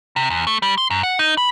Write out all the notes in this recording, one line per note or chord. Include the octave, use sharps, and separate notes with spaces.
C3
E2
A3
G3
C6
F#2
F#5
D#4
B5